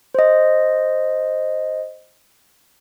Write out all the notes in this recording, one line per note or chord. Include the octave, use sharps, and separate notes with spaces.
C5 D#5